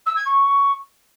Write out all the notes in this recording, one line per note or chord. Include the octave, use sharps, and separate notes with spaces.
E6
G#6
C#6